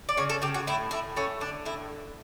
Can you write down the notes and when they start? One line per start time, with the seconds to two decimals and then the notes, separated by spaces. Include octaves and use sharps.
0.09 D5
0.17 C#3 C#5
0.30 A4
0.42 C#3 G4
0.54 F#4
0.67 A2 E4
0.91 A2 E4
1.17 A3 C#4
1.40 D3 D4
1.65 A2 E4